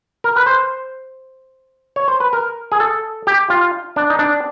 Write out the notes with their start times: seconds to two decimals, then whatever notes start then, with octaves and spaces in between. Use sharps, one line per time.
0.24 A#4
0.37 B4
0.46 C5
1.96 C#5
2.08 C5
2.20 B4
2.33 A#4
2.72 G#4
2.80 A4
3.27 G4
3.50 F4
3.96 D4
4.10 D#4
4.19 D4